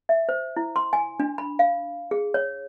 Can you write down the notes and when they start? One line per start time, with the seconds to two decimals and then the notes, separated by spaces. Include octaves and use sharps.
0.09 E5
0.29 C5
0.57 E4
0.76 C6
0.93 G#5
1.20 D4
1.38 B5
1.59 F5
2.11 G#4
2.34 C#5